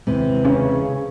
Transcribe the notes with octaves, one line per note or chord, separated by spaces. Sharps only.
D#2 C3 E3 G#3
C#3 C#4